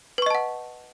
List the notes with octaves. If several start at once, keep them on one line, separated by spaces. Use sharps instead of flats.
B4 D#5 F#5 A5 C#6